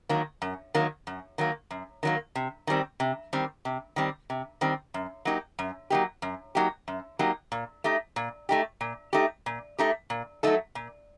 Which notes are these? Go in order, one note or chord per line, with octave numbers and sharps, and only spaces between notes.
D#3 F#3 A#3
F#2
D#3 F#3 A#3
F#2
D#3 F#3 A#3
F#2
D#3 F#3 A#3
C3
D#3 G3 C4
C3
D#3 G3 C4
C3
D#3 G3 C4
C3
D#3 G3 C4
F#2
F#3 A#3 D#4 G4
F#2
F#3 A#3 D#4 G4
F#2
F#3 A#3 D#4 G4
F#2
F#3 A#3 D#4 G4
A#2
A3 D#4 G4
A#2
A3 D#4 G4
A#2
A3 D#4 G4
A#2
A3 D#4 G4
A#2
F#3 A3 D#4 A4
A#2